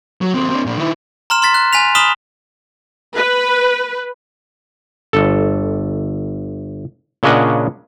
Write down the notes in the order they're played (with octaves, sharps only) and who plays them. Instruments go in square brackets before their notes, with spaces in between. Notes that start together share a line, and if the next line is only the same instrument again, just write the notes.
[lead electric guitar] F#3
D#2 C4
C4 D4
A#2 D4
D#3 E4
[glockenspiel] A#5 C6 F6 E7
C6 F6 A6 B6
F#6
G#5 F#6 B6 F7
B5 D#6 F6 B6 E7 G7
[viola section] B4
[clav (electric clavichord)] G1 A4
A#2 C#3 C#4 D4 D#5 F#5